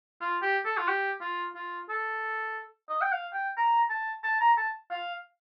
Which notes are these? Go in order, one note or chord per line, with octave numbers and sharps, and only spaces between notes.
F4
G4
A4
F4
G4
F4
F4
A4
D#5
G5
F5
G5
A#5
A5
A5
A#5
A5
F5